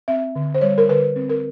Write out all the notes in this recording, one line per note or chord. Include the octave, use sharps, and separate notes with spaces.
C4 E5
D3
C5
G3 C#5
A#4
D3 B4
C4
A#4